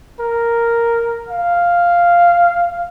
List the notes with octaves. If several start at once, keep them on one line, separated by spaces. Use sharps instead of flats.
A#4
F5